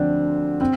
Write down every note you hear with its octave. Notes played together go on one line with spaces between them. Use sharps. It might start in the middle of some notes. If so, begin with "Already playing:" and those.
Already playing: D2 D3 F3 C4 D4
C4